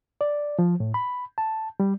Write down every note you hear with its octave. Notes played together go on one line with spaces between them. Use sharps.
D5
F3
A2
B5
A5
G3